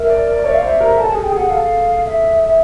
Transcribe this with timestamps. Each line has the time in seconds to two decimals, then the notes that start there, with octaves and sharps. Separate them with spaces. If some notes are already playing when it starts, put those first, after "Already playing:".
Already playing: A#4 E5
0.10 D5
0.27 D5
0.39 D5
0.45 C#5 E5
0.54 F5
0.63 C5 E5
0.80 A#4
0.97 A4 A5
1.10 G#4 G#5
1.23 G5
1.32 G#4 F#5
1.50 A4 F5
2.03 F5
2.06 E5
2.44 E5